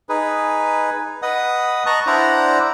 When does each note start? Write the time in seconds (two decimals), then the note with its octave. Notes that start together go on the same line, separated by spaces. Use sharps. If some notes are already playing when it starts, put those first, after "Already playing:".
0.09 D#4 G#4 B4
1.22 B4 D#5 F#5 D#6
1.86 D#5 A5 A#5 C#6 F#6
2.07 D4 E4 C5 D5 F#5 A#5